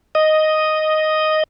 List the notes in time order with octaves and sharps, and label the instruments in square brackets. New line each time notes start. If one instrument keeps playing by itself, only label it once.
[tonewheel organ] D#5